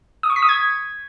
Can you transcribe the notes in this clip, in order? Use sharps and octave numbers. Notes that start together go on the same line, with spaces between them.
D#6
C#6
B6
D#6
G#6